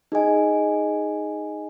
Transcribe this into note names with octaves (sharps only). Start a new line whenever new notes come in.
D#4 G#4 D#5 G#5